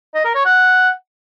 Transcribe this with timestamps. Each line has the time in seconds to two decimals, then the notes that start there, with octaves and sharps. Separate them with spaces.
0.14 D#5
0.25 A#4
0.35 C#5
0.45 F#5